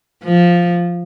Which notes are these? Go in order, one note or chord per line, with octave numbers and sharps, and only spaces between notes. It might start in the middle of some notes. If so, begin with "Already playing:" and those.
F3